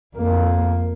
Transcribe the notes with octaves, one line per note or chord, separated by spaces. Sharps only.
F2 A#3